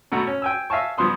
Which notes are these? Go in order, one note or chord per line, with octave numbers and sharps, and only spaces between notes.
B2 A3 F#4 A#5 C#6
C#4
G5 G#5 E6
E5 F5 G#5 A5 C#6
G2 F3 B3 C6 D#6